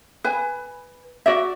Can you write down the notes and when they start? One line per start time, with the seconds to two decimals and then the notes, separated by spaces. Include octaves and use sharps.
0.24 B4 G#5
1.26 F#4 D5 E5